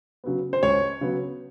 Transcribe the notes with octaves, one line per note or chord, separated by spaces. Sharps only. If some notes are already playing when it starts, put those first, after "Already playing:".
C#3 F#3 B3
C5
C#2 C#5
C#3 F#3 B3